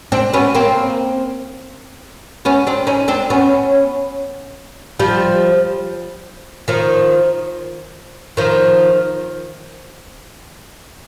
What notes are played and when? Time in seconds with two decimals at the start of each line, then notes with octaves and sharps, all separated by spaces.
0.12 C4 D4
0.33 B3 C#4
0.55 A#3 C4
2.45 B3 C#4
2.67 C4 D4
2.87 C#4 D#4
3.08 C4 D4
3.30 B3 C#4
4.99 F3 G3
6.68 D#3 F3
8.37 D#3 F3